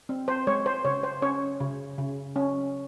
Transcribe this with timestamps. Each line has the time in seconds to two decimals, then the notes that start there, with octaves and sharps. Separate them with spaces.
0.09 C4
0.28 C5
0.47 G#3 C#5
0.66 C5
0.85 C#3 C#5
1.03 C5
1.22 C#4 C#5
1.60 C#3
1.98 C#3
2.36 C#4